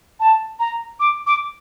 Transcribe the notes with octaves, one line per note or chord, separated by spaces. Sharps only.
A5
A#5
D6
D6